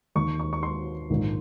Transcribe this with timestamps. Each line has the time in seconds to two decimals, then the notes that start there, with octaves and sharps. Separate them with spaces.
0.15 D#2 D#3 C#6
0.39 C#6
0.53 C#6
0.63 C6
1.10 A#1 G#2 D#3